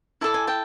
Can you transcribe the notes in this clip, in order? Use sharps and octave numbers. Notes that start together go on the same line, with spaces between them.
E4 A4 D5 A5
G#5
G5 A5